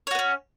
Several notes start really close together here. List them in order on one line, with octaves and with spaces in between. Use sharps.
C#5 F#4 B3 C#4